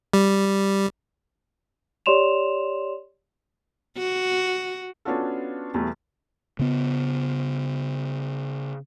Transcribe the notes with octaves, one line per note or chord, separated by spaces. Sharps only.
G3
G4 C#5 D5 C6 E7 F7
F#4
B3 C#4 D4 F4 F#4 A4
E2 B2 G3 A3
C#3 B3